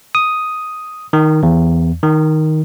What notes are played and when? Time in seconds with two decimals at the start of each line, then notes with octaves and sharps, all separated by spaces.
0.15 D#6
1.13 D#3
1.43 E2
2.03 D#3